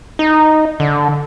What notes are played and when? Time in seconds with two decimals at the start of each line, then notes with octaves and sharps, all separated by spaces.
0.19 D#4
0.80 D3